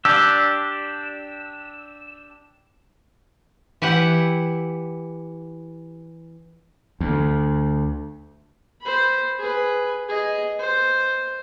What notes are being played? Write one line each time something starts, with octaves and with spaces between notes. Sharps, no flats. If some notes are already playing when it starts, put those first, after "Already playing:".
D4 G4 E6
E3 E4 G4 F#5
D2
C5 B5
G#4 B4
G#4 D#5
C5